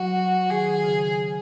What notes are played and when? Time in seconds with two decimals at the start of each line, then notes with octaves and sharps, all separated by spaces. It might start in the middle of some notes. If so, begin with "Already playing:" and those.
Already playing: F#3 F#4
0.50 D#3 G#4
0.84 C#3